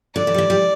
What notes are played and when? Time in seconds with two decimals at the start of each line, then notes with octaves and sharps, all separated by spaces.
0.15 D3 D5
0.27 E3
0.34 G3
0.38 E3
0.50 G3